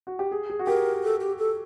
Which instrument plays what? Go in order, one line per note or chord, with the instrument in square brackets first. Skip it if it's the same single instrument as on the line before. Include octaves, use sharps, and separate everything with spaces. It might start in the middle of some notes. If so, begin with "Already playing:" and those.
[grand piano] F#4
G4
G#4
G#4
F#4
[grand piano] G4 [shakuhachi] A#4
[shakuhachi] A4
G4
A4